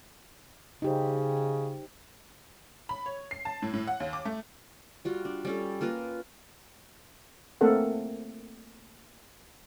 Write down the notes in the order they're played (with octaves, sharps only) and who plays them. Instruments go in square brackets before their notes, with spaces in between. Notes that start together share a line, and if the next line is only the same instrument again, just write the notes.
[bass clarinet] C#3 [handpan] D#4 G4 C5
[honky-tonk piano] B5
C#5
C7
A5
A2
A2
F#5
D#2
D6
A3
[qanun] G3 F4 F#4
D4
G3 C#4 A4
A#3 F4 A#4 B4
[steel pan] A3 A#3 C4 A4 A#4 F#5